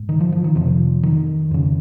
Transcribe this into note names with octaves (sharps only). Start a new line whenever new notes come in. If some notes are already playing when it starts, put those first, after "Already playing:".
Already playing: G#2
D#3
F3
F3
D#3
F2 C3 F3
D#3
F2 C#3